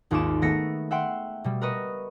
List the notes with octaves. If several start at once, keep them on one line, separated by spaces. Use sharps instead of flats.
G#1 D#2 F4 C#6 D6 E7
D#3 A3 B3 E5 A#6 C#7
E5 F#5 G5 C6
B2 G3
A#4 B4 D#5 C#6